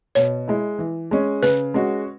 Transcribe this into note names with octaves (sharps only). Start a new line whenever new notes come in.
B2 C#5
G#3 E4
E3
G#3 C#4
C#3 B4
G#3 C#4 F#4